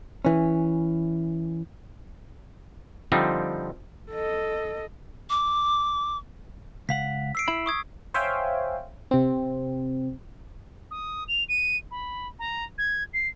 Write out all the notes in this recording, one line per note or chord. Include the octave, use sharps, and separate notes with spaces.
E3 C#4
D3 F3 G3 C4 D#4
A4 D#5
D6
C#2 F5 F#5 B6
E6 C7 D7
E4 E5 B5
C#6 D#6 G#6
C5 C#5 E5 F5 G5 G#5
C3 C4
D#6
F7
D#7
B5
A#5
G#6
C7